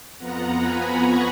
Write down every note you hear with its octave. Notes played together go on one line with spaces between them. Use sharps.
F2 F3 B3 F#5 A#5
G#5 B5
A#5 C#6